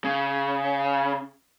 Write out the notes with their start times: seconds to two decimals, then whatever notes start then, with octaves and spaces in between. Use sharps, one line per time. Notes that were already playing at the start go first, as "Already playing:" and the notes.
0.05 C#3